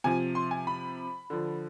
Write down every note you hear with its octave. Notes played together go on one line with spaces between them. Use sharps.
C3 F3 G#5
C6
G#5
B5
D3 F3